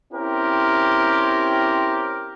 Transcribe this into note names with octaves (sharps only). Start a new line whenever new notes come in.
C4 C#4 E4 G4 A#4